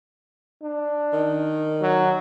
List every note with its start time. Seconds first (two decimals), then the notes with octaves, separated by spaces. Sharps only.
0.62 D4
1.12 D#3
1.81 F#3